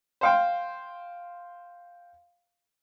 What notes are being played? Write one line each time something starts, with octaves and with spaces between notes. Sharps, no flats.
C5 F5 G5